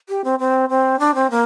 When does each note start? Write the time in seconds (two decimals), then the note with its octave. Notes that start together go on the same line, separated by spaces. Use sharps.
0.09 G4
0.24 C4
0.39 C4
0.69 C4
0.99 D4
1.15 C4
1.30 A#3